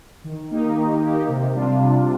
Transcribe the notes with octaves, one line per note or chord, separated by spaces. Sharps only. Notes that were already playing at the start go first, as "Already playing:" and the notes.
D#3
A#3 D#4 G4
D#3
A#3 D#4 G4
C3
G3 D4 F4
C3